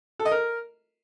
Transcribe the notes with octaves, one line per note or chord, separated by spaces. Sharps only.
A4
D#5
A#4